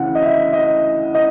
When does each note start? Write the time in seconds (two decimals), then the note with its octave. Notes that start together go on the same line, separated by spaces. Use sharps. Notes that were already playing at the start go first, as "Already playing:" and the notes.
Already playing: D2 C#3 E3 F#5
0.15 D#5
0.22 E5
0.53 D#5
1.14 D#5